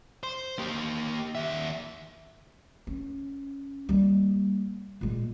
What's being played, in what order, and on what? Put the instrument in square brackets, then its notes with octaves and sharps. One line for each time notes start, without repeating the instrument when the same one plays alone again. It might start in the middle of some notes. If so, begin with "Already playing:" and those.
[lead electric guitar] C5
A#3 G4
D#2 E5
[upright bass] C#4
G3 A#3
A#2 G#3